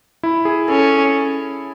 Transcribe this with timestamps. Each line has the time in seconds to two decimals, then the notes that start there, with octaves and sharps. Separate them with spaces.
0.23 E4
0.45 G#4
0.68 C#4 A4